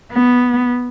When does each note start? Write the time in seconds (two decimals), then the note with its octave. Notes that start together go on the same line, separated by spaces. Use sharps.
0.12 B3